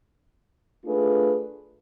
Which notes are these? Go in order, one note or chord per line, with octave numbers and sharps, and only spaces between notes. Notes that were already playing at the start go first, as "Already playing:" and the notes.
A3 D4 F4 G#4 B4